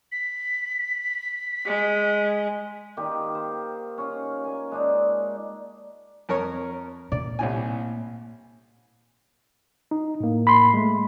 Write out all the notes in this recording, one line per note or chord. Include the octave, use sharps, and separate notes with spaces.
B6
G#3
D#3 A#3 G4
C5
C#4 F4
A#3 G#5
G#3 D4 D#4
F2 A#4 C#5
A#2 D5
C2 A2 G#5
D#4
A2 A#3
B5 C6
G#3 A3